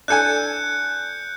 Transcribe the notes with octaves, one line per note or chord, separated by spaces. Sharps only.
D4 A4 G#5 F#6 G6 C#7